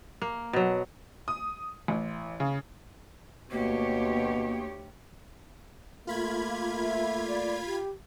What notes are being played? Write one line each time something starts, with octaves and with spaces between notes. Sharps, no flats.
A#3
B2 F#3
D#6
A1
C#3
D2 B2 A#3 G4 C#5
A3 A#3 F4 B5 G#6
E5
D5
G4